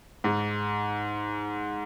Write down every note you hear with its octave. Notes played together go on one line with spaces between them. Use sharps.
G#2